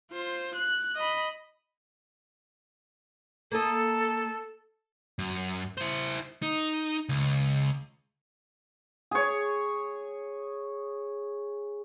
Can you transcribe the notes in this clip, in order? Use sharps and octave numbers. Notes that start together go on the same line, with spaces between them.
F4 C5
F#6
D#5 B5
A#3 A4 D#5
F#2
E4 C5
D#4
C#2
G#4 C#5